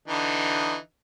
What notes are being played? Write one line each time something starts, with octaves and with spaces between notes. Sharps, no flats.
D3 E3 D#4